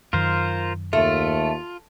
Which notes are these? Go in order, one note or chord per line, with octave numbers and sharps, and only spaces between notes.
F#2 D#3 F4 A#4 C5
D#2 A3 F4